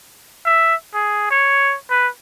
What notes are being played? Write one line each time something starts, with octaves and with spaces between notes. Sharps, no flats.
E5
G#4
C#5
B4